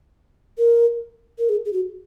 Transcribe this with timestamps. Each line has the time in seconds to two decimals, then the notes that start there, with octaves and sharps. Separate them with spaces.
0.58 A#4
1.38 A#4
1.49 G#4
1.65 G#4
1.73 F#4